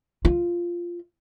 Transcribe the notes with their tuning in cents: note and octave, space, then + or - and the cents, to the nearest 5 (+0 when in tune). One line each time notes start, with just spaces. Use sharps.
F4 -10